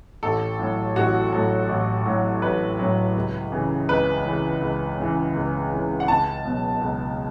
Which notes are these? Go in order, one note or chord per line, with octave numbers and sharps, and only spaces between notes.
A1 A4
A2 F#3
A1 F#4
A2 F#3 A4
A1
A2 F#3
A1 B4
A2 F#3
C#2
C#3 E3
C#2 B4
C#3 E3
C#2
C#3 E3
C#2
C#3 E3
F#5
C#2 A5
B2 F#3
C#2